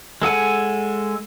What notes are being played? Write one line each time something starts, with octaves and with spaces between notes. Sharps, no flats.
G#3 A4 F#5 G#5